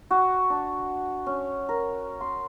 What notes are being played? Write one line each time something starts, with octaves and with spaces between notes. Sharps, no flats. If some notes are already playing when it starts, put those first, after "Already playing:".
F#4
D4
C#4
A#4
C6